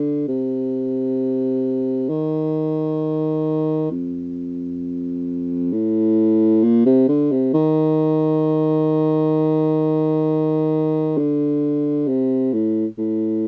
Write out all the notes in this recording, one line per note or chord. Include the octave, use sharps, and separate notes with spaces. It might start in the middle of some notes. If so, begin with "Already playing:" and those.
Already playing: D3
C3
D#3
F2
A2
A#2
C3
D3
C3
D#3
D3
C3
A2
A2